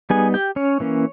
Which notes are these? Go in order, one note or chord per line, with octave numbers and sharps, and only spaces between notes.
G3 B3 D#4 G#4 G#5
G4 G5
C#4 C#5
E3 A#3 C#4